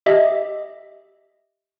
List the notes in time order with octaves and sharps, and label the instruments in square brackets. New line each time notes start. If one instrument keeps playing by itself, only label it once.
[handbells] G4 D#5 E5